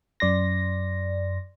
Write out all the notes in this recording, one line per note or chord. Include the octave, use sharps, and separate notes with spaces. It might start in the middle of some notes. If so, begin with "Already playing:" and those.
F#2 D5 C6 A#6